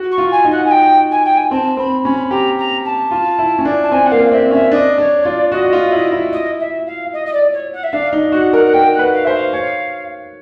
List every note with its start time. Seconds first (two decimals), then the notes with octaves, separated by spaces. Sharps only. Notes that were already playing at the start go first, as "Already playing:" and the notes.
Already playing: F#4
0.11 C#6
0.18 F4
0.31 G#5
0.45 D#4
0.51 F#5
0.65 G#5
0.70 G5
1.11 G#5
1.24 G5
1.37 G#5
1.51 C4 A5
1.77 C4 B5
2.04 C#4 B5
2.31 G4 A#5
2.58 A#5
2.85 A5
3.11 F4
3.39 E4
3.59 C#4
3.65 D4
3.83 A5
3.92 C4 G#5
4.06 F#5
4.11 A#3 F5
4.32 C4 E5
4.51 C#4 E5
4.72 D4 D#5
4.98 D4 C#5
5.21 C#5
5.25 F4 D5
5.52 F#4 D#5
5.65 F#4
5.73 F4
5.92 E4
6.12 E4
6.32 D#5
6.59 E5
6.86 F5
7.13 D#5
7.25 D#5
7.32 D5
7.53 C#5
7.73 F#5
7.83 E5
7.92 D4 F5
8.13 D#4
8.32 F#4 F#5
8.53 A#4 F#5
8.65 F#5
8.73 A#4 G5
8.93 F#5
8.99 B4
9.13 F5
9.24 C5 E5
9.33 F5
9.53 C#5